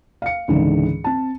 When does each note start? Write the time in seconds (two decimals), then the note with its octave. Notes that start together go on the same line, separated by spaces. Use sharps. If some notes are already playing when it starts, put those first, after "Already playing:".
0.22 F5 C#7
0.48 C#2 G#2 D3 E3
1.04 C4 A5